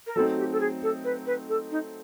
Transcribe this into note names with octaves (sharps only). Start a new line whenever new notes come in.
A#4
F#3 A3 C4 D#4 A4
G4
A4
G#4
A4
B4
B4
A4
D#4